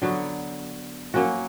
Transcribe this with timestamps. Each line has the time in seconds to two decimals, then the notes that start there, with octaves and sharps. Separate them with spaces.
0.02 D3 F#3 B3
1.14 F#3 A#3 C#4 F#4